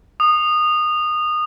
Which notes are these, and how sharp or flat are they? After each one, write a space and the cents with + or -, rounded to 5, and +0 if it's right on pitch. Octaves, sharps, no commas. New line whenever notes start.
D#6 -25